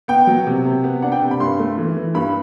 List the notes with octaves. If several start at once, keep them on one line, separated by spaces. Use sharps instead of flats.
B3 G5
F#3
C3
C3
B3
D4 F#5
G5
C3
B5
G2 C6
A3
E3
E3
G2 B5